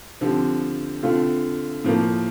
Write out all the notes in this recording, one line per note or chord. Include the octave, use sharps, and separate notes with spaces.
D3 F3 C4 G4
D3 A3 C4 F4 A4
A2 F3 A#3